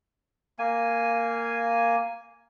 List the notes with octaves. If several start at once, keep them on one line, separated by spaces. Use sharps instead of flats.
A#3 G#5